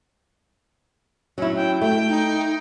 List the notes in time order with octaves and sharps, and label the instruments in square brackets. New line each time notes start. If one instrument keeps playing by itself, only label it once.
[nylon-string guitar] F#3 E4 [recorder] C#4
[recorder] G5
[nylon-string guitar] A3 [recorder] G5
[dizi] D#4